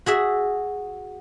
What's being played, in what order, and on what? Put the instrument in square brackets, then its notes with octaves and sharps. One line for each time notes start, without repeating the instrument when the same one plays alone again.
[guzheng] F#4 G#4 E5